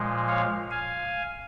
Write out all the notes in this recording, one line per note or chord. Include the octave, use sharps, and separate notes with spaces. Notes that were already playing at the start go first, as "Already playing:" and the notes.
Already playing: A#2 F3 G#3
C#5 F5
F5 G#5